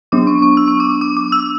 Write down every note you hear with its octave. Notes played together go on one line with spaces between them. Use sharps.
F#3 B3 D4 D6
C#6
C#6
E6
C#6
D6
D6
D6
E6